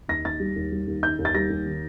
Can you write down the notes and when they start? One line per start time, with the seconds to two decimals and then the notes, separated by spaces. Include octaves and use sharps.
0.08 D#2 A#6
0.25 D#2 A6
0.40 G3
0.56 D#2
0.72 G3
0.87 D#2
1.02 D#3 G6
1.19 D#2
1.25 A6
1.34 G3 A#6
1.50 D#2
1.66 D#3